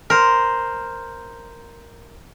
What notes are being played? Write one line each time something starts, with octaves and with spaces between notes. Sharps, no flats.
A#4 C5